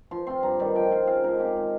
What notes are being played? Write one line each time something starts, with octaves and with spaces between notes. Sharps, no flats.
F3 C6
C4 F4 C6
G2 A#5
D#3 G3 C4
F3 G5
C4 F4
C#3 F5
F3 G#3 D#4 A#4
C3 G4
D#3 G#3